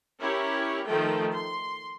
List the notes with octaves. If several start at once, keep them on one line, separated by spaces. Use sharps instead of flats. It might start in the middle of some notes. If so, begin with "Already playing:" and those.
C#4 E4 G4 A#4 C#5
D#3 F3 A3 G5
C6